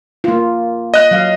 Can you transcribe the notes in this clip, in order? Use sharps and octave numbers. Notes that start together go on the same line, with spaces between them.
A#3 F4
D#5 F#6
F#3 F5